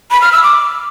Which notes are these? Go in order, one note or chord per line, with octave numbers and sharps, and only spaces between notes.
B5
F6
E6
D6